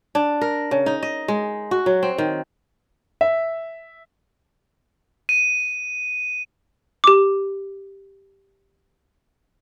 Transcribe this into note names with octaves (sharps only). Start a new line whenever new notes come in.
D4
A#4
C#3
D#4
D#5
G#3
F#4
F#3
C4
D#3
E5
D#7
G4 D6